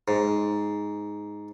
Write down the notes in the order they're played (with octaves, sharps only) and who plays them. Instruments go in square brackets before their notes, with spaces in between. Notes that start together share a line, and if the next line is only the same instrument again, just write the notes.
[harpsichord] G#2